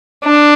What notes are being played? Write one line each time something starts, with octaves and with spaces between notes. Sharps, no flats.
D4